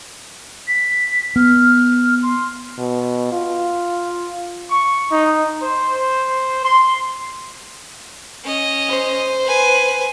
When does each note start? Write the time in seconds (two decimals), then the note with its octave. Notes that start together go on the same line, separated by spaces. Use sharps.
0.67 B6
1.36 B3 F6
2.22 C6
2.78 B2
3.33 F4
4.70 C#6
5.12 D#4
5.63 C5
6.64 C6
8.44 C#4 D#5
8.89 C5
9.45 B4 G#5